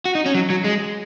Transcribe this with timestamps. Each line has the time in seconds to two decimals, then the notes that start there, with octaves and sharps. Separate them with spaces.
0.05 F#4
0.15 D#4
0.26 C#4
0.35 F#3
0.50 F#3
0.64 G#3